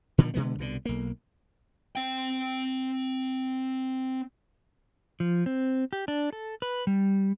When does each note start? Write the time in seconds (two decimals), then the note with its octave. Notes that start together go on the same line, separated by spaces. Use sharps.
0.18 A#2 D3 D#3 F3
0.34 B2 D3 G#3 B3
0.59 C2 B2 D3
0.85 B1 A#3
1.96 C4 G5
5.20 F3
5.46 C4
5.93 G4
6.08 D4
6.33 A4
6.62 B4
6.87 G3